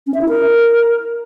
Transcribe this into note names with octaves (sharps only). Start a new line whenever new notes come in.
C#4
E5
E4
A#4